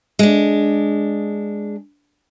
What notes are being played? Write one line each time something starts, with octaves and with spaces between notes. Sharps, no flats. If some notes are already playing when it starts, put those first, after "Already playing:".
G#3 D4